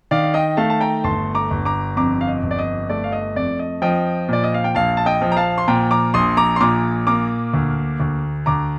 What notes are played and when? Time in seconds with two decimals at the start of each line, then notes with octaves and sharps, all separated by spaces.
0.11 D#3 D5 F5
0.24 F5
0.34 D#5 G5
0.57 A3 F5 A5
0.70 A5
0.81 G5 A#5
1.04 G1 A5 C6
1.35 A#5 D6
1.51 G1
1.65 A#5 D6
1.96 F2 A#5 D6
2.21 F5
2.27 D#5
2.43 G1
2.51 D5
2.59 D#5
2.89 A3 D5
3.04 F5
3.12 D#5
3.35 F2 D5
3.59 D#5
3.82 F3 D#5 G5
4.28 A#2 D5
4.44 D#5
4.54 F5
4.64 G5
4.75 A#1 F5 A5
4.97 A5
5.06 D#5 G5
5.22 F3
5.32 A#5
5.37 F5 A5
5.58 C6
5.68 A#2 G5 A#5
5.91 A#5 D6
6.14 A#1 C6 D#6
6.37 A#5 D6
6.56 C6
6.60 A#2 A#5 D6
7.07 A#3 A#5 D6
7.54 D2
8.00 D2
8.46 D2 A#5 D6